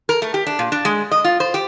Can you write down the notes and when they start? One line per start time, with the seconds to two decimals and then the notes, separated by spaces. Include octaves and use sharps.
0.09 A#4
0.22 A3
0.34 G4
0.47 D4
0.59 A#2
0.72 D4
0.85 G#3
1.11 D#5
1.24 F4
1.40 C5
1.54 G4